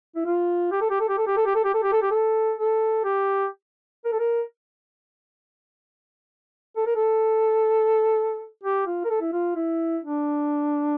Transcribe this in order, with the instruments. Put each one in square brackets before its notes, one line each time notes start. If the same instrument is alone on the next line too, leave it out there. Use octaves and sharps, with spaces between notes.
[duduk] E4
F4
G4
A4
G4
A4
G4
A4
G4
A4
G4
A4
G4
A4
G4
A4
G4
A4
A4
G4
A#4
A4
A#4
A4
A#4
A4
G4
F4
A#4
A4
E4
F4
E4
D4